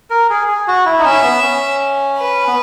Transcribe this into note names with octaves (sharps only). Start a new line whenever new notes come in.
A#4
G#4
G#4
F#4
E4
D#4
C#4 E5
B3
C#4
B4
B3